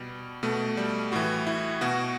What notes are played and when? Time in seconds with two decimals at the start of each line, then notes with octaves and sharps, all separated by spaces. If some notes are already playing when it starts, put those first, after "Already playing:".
Already playing: B2 G3
0.43 B2 A3
0.77 G3
1.12 A2 E3 F#4
1.47 E4
1.81 B2 F#4